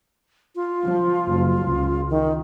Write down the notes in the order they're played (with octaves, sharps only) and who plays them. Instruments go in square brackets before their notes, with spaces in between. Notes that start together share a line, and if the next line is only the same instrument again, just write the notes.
[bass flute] F4
[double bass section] F3
F#1
C#2
[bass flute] D#3